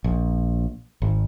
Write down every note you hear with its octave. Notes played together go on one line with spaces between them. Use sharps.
A#1
G#1